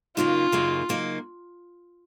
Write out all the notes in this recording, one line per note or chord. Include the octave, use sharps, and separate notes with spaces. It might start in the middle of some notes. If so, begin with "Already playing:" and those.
F#2 C#3 F#3 A#3 D#4 F4
F#2 C#3 F#3 A#3 D#4
C#3 F#3 A#3 D#4